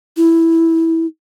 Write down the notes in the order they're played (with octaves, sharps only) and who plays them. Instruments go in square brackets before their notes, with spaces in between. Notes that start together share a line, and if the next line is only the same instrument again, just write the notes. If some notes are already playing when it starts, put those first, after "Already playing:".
[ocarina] E4